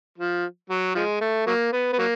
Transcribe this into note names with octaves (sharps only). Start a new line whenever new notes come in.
F3
F#3
F3 G#3
A3
F#3 A#3
B3
B3
F#3 A#3